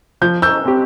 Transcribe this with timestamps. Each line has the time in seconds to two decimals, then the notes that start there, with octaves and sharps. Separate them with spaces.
0.22 F3 G6
0.42 E6 G6
0.65 C4 G4